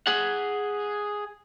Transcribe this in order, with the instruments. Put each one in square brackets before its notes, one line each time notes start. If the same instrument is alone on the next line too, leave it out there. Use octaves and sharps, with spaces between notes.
[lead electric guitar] G#4 F#5